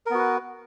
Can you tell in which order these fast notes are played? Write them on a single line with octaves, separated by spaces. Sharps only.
A#4 B3 F#4 B4